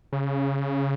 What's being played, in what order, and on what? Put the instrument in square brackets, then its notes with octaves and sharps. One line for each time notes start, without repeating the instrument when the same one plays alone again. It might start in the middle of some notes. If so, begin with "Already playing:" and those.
[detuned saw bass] C#3